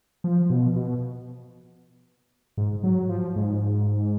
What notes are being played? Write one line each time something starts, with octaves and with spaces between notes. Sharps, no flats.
F3
B2
B2
G#2
F#3
F3
G#2